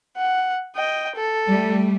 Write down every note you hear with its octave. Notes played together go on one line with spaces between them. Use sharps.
F#5
D#5 G5
A4
G3 A3